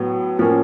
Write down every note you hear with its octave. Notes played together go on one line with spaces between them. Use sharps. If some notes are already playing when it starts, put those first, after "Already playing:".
Already playing: A2 F#3 B3
A2 F3 A#3 C#4